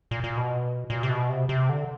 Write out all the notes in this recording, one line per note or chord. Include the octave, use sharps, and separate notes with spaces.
A#2
A#2
B2
A#2
C3
B2
C3
C3
D3